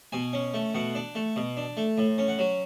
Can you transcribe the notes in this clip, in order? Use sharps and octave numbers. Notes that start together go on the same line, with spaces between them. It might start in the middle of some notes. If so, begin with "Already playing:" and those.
B2 G#5
C#4
A3
B2 F#5
D4
A3
B2
D4
A3
A2
C#4
F#5
F#3